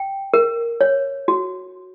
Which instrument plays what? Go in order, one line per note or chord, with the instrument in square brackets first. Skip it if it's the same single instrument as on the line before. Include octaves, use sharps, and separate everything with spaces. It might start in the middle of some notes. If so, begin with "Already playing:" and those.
Already playing: [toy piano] G5
A#4
C#5
F#4